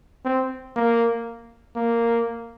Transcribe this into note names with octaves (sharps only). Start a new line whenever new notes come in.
C4
A#3
A#3